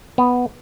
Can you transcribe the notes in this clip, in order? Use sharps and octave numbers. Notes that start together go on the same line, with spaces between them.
B3